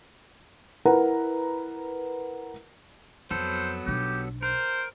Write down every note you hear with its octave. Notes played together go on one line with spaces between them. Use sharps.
E4 A#4 B4 F#5 A#5
F2 F#3 B3 A4 C5
B1 D4 G4
A#4 C5